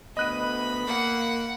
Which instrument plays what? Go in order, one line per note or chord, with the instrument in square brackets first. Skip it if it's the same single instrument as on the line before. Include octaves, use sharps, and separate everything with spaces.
[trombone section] D2 B3 [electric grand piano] D#5 F#6 D#7 [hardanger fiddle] B5
[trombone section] A#3 [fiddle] F#5